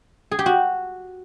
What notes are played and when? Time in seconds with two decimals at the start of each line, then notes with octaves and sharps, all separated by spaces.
0.31 G#4
0.39 G4
0.46 F#4